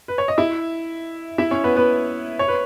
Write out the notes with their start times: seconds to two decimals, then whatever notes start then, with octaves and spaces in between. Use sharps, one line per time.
0.08 B4
0.18 C#5
0.28 D#5
0.38 E4 E5
1.38 E4 E5
1.51 C#4 C#5
1.64 B3 B4
1.76 B3 B4
2.39 C#5
2.48 B4